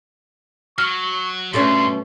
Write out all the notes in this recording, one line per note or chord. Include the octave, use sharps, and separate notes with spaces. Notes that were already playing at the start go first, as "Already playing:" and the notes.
F#3 C#6 F6
G2 B2 A3 C#4 C6